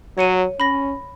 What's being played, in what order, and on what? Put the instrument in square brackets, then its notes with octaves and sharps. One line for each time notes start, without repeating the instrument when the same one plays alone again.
[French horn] F#3 [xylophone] C#5 C#7 D#7
[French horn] C#4 [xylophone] B5 A#6